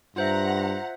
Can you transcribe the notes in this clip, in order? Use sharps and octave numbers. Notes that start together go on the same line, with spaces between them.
G2 F4 C5 E5 F#5 A#5